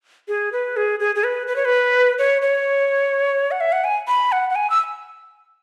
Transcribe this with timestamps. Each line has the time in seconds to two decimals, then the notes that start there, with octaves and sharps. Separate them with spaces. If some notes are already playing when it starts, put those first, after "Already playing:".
0.28 G#4
0.53 B4
0.77 G#4
1.00 G#4
1.15 G#4
1.24 B4
1.47 B4
1.56 C#5
1.65 B4
2.18 C#5
2.42 C#5
3.51 F#5
3.61 E5
3.72 F#5
3.84 G#5
4.08 B5
4.32 F#5
4.50 F#5
4.55 G#5
4.70 E6